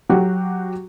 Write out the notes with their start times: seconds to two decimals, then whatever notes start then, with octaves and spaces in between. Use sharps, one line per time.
0.09 F#3 F#4 G4